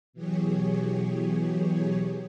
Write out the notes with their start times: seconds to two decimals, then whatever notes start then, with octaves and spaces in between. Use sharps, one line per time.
0.13 B2 E3 F#3 G4 G#4 C#5